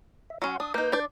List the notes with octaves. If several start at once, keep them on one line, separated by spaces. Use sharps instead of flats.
E5
F#3 C#4 F#5 C6
D4 D#6
A#3 D#4 B4 G6
D4 D5